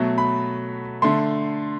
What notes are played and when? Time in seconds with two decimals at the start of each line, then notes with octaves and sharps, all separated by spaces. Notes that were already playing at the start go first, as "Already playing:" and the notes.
Already playing: B2 F#3 A3
0.18 B5
1.02 D3 A3 C6